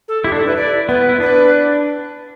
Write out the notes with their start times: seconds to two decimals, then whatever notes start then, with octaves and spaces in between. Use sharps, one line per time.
0.08 A4
0.24 E4 G4
0.32 D4
0.36 A4
0.41 E4
0.46 B4
0.57 D5
0.89 B3 B4
1.09 E4
1.20 D4 B4